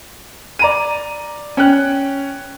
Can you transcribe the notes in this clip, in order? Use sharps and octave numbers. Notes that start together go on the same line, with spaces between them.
D5 A#5 D#7
C#4 G5 F#6